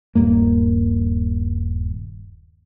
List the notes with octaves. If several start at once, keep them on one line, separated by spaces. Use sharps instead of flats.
D#1 G2 A#3